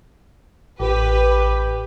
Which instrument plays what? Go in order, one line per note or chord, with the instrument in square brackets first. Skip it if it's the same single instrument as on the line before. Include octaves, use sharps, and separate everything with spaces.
[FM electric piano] A1 [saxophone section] G4 [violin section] B4